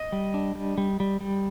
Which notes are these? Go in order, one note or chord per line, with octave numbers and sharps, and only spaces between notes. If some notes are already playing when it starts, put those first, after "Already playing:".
Already playing: D#5
G3
D4
G3
G3
G3
G3